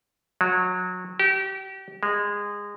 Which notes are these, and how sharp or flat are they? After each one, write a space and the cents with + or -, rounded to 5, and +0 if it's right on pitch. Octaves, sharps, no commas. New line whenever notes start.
F#3 -25
G4 -30
G#3 -20